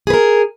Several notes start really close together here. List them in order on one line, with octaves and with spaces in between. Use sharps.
G#4 B4 A#4